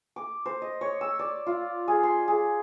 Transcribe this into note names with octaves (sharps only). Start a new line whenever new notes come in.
D6
C5
D#5
C#5
E6
D5
F4
G#4
C6
G#4